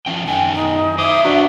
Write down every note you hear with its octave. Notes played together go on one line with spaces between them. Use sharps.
F3 C#4 G5
F#2 D#3 G5 G#5
D#4
F#2 C5 E5 D6 D#6
D4 F#4 B4 D#5 A#5